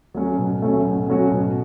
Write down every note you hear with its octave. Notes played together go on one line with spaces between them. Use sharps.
F#3 A3 C#4 F#4
B2
F#3 A3 C#4 F#4
B2
F#3 A3 C#4 F#4
B2